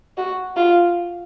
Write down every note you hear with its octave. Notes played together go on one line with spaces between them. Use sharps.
F#4
F4